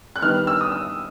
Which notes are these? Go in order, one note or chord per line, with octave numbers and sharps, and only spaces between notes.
F#6
D#3 G3 B3 D4 F6
E6
D#6
E6